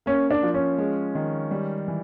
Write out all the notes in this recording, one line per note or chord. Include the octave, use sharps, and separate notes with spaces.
A#3 C#4
D4
F3
C#4
G#3
D#3
G3
E3